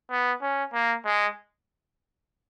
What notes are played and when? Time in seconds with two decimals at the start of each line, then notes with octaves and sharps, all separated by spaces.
0.11 B3
0.42 C#4
0.73 A#3
1.05 G#3